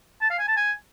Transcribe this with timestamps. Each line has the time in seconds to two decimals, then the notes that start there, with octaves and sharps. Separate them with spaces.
0.21 A5
0.30 F5
0.39 G#5
0.48 A5
0.57 G#5